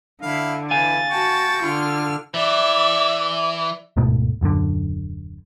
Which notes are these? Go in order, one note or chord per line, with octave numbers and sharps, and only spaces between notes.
D3 E4 F5
E3 F5 G#5 A6
F#4 G5 A5 C#6
D3 F4 F6
E3 D5 E5
D1 G#2 B2 A3
D#1 F#2 A2 D3